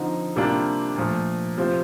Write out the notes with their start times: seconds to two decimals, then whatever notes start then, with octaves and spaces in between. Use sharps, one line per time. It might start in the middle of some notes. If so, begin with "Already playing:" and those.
Already playing: D3 F3 C4 D#4
0.36 C3 G3 A#3 D4 F4
0.96 A#2 F3 A3
1.57 C3 F3 C4 F4